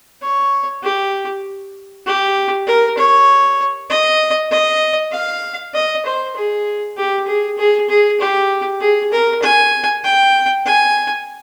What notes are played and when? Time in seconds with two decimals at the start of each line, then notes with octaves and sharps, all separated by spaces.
0.21 C#5
0.83 G4
2.06 G4
2.66 A#4
2.97 C#5
3.89 D#5
4.51 D#5
5.12 F5
5.74 D#5
6.05 C5
6.36 G#4
6.97 G4
7.27 G#4
7.57 G#4
7.89 G#4
8.20 G4
8.80 G#4
9.11 A#4
9.42 G#5
10.04 G5
10.65 G#5